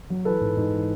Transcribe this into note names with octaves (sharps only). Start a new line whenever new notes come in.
F#3
E3 A4 B4
G#2
G#2
E3